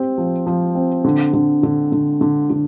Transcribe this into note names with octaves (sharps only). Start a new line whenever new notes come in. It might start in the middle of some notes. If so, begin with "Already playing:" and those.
Already playing: C4 G4
F3
F3
C4
D3
D3
D3
D3
D3
D3